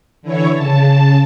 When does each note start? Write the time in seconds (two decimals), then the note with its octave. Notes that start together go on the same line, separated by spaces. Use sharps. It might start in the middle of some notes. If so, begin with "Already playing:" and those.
0.22 D3 E3 E4 C#5
0.54 C#3 A5